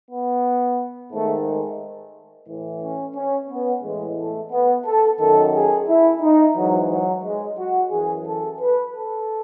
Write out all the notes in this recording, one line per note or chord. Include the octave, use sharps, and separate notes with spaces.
B3
G#2 D#3 A3
G#3
A2 E3
C#4
C#4
B3
A2 E3 G#3
A3
B3
A4
F#2 D#3 A4
G#4
E4
D#4
G#2 E3 F#3
F#3
G#3
F#4
F#2 E3 G#4
A4
B4
A4